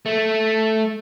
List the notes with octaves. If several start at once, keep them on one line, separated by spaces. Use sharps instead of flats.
A3